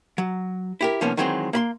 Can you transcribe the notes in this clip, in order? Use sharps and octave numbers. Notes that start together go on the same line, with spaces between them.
F#3
E4 G4 A#4
C2 F3 A#3 B3 C#4 D#4
D#3 E3 F#3 G#3 C4
A#3 B5 C6